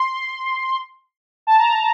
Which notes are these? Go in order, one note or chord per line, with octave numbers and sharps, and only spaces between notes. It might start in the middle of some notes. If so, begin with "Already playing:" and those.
Already playing: C6
A5
A#5